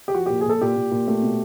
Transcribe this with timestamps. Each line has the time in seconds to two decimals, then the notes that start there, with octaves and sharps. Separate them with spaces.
0.08 G4
0.15 F3 F#4
0.26 A#2 G4
0.41 G#4
0.45 A#2 A4
0.61 A#2 G4
0.76 A#2
0.91 A#2
1.08 A3
1.22 B2